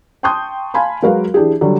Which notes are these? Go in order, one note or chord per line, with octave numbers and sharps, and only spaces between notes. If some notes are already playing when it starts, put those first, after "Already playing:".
G5 A5 C6 C#6 D#6 G6
F5 G#5 A5 B5 C6
F#3 G#3 F#4 A#4 B4 F5
E3 D4 G4 G#4
D3 F#3 G3